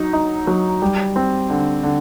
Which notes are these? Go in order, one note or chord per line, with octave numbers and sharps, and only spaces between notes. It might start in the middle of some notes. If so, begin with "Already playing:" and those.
Already playing: F#3 D#4
D#4
F#3
G3
C4
D3
D3